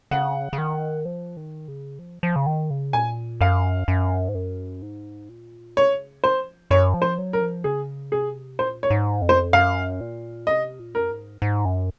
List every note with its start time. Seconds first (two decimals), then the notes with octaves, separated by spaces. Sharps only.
0.11 C#3 F#5
0.53 C#3
0.58 D#3
1.05 F3
1.37 D#3
1.68 C#3
1.99 F3
2.23 F3
2.36 C#3
2.46 D#3
2.70 C#3
2.93 A#2 G#5
3.41 F#2 F5
3.88 F#2
4.29 G#2
4.35 F#2
4.82 G#2
5.29 A#2
5.76 C#3 C#5
6.23 F3 C5
6.71 F#2 C#5
6.94 F3
7.02 C5
7.18 F#3
7.33 A#4
7.41 F3
7.64 C#3 G#4
8.12 C3 G#4
8.59 A#2 C5
8.83 C#5
8.90 G#2
9.22 F2
9.29 C5
9.53 F#2 F5
10.01 A#2
10.47 C3 D#5
10.79 A#2
10.95 A#4
11.00 F#2
11.10 G#2
11.42 G#2
11.65 F#2